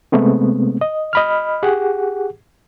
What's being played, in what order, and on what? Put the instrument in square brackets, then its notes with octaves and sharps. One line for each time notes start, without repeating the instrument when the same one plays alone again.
[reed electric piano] C3 G#3 A3 B3 C4
D#5
D#5 B5 F6
G4 G#4 F#5